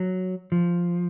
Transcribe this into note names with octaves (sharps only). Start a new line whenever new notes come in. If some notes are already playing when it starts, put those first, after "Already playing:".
Already playing: F#3
F3